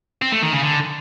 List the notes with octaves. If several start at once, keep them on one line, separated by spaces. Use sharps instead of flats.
C4
A3
D#3
C#3
D3